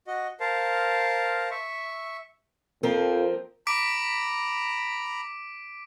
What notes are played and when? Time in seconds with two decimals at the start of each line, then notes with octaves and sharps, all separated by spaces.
0.07 F#4 D#5
0.40 A#4 C5 F5 A5
1.51 E5 C#6
2.83 F2 F3 C4 A#4
3.67 A#5 B5 D6 B6 D7